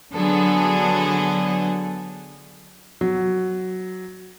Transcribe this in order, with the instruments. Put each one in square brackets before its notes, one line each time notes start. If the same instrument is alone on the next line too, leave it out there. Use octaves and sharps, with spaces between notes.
[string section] D3 F#3 B3 G#4 A4
[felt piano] F#3